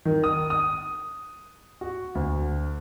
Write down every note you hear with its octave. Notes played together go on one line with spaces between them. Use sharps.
D#3
D#6
D#6
F#4
D2